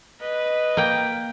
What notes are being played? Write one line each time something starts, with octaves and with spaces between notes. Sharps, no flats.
B4 D#5
A#3 G5